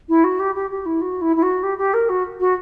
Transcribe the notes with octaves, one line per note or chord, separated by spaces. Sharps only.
E4
F#4
G4
G4
G4
E4
F#4
E4
E4
F#4
G4
G4
A#4
F#4
F#4